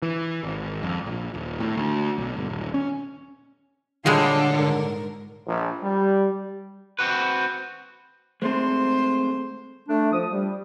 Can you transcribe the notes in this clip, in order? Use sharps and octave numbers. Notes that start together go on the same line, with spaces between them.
E3
G#1
F2
A#1
D#1
A2
D2
B1
G1
D#1
C#4
A#2 D3 G3 G#3 F4 A4 C#5
G#2 A#4
A#1
G3
C4 F#4 B4
G#3 A3 C4 C5
A3 D4
F3 D#6
G3